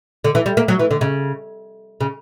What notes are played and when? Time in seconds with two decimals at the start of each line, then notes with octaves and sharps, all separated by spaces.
0.24 D3
0.35 E3
0.46 G3
0.57 A#3
0.68 F#3
0.79 E3
0.91 D3
1.01 C#3
2.01 C#3